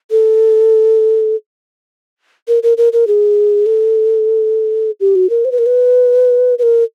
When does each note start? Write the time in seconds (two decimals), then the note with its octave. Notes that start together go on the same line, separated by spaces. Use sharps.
0.11 A4
2.48 A#4
2.63 A#4
2.77 A#4
2.93 A#4
3.07 G#4
3.66 A4
5.00 G4
5.15 F#4
5.30 A#4
5.45 C5
5.52 B4
5.58 A#4
5.66 B4
6.59 B4
6.63 A#4